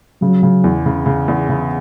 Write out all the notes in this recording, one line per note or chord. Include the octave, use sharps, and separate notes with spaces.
C#3 F#3
C#3
E2
C#3
C#3
E2
C#3